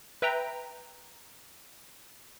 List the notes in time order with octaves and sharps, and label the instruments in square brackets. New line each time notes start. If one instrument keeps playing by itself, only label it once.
[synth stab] B4 E5 G5 A#5